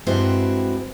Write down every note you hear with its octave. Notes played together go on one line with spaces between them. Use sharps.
G2 G#3 C4 E4 F#4